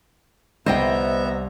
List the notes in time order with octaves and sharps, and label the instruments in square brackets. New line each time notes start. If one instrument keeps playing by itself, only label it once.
[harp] C2 [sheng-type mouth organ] B3 E5 A#5 [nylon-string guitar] C5 D#5 G5